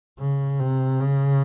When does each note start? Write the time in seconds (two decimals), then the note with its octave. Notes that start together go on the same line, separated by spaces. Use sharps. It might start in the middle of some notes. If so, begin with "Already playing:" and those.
0.19 C#3
0.60 C3
1.00 C#3